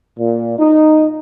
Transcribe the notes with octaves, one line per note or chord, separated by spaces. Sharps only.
A#2
D#4